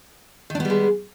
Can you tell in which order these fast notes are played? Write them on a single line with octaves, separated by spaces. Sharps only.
D#3 D4 B3 G3 G#3